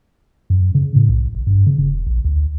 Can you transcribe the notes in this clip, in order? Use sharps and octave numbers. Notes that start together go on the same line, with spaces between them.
F#2
C#3
A2
B1
G#1
G2
C#3
E1
A#1
D2